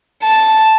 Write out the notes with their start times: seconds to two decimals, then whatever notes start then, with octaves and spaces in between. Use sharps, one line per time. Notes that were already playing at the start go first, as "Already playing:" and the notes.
0.23 A5